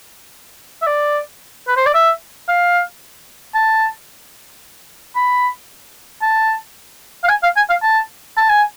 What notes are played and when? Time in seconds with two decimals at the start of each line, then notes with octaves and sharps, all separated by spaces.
0.82 E5
0.87 D5
1.68 B4
1.77 C5
1.86 D5
1.94 E5
2.48 F5
3.55 A5
5.16 B5
6.22 A5
7.24 F5
7.29 G#5
7.43 F5
7.57 G#5
7.70 F5
7.83 A5
8.37 A5
8.50 G#5